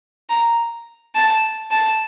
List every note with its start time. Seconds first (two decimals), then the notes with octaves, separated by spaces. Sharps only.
0.30 A#5
1.15 A5
1.71 A5